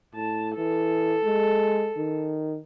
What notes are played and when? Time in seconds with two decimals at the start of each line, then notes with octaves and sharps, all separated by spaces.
0.15 A2 A5
0.57 E3 A4
1.24 G#3
1.97 D#3